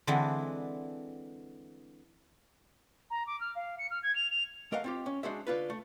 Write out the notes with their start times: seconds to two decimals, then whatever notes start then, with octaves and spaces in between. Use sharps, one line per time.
0.07 D3 E3 G#3 C4 D4
3.10 A#5
3.26 D6
3.40 F6
3.55 F5
3.78 C#7
3.90 F6
4.03 G#6
4.15 F7
4.30 F7
4.72 A3 A#4 D#5 F5 F#5
4.84 C4 F4 G4
5.06 C#4
5.23 G#3 D4 F#4 G#4 C5 E5
5.47 D3 F4 B4
5.70 A3